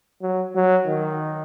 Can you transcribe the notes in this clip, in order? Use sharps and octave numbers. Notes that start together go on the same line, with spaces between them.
F#3
F#3
D#3